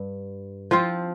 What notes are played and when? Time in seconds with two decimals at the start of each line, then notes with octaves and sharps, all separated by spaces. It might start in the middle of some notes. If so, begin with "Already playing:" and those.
Already playing: G2
0.71 F3 C4 F4